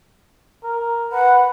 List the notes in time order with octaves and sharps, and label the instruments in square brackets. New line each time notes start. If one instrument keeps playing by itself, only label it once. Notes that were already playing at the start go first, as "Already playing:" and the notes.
[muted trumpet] A#4
[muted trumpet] B4 [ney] F#5